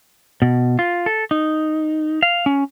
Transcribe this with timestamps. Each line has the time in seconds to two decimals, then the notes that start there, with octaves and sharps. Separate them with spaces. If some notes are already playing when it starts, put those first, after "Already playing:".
0.42 B2
0.79 F4
1.06 A4
1.31 D#4
2.23 F5
2.46 C#4